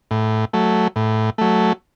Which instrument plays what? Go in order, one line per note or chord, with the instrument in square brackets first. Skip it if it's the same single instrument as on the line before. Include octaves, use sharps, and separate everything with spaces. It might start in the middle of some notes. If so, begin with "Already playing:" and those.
[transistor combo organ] A2
F#3 A3
A2
F#3 A3